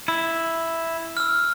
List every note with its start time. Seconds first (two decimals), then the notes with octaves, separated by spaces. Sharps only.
0.08 E4
1.17 E6 F6